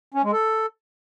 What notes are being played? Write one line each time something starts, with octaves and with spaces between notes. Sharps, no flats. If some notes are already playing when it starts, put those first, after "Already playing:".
C#4
G#3
A4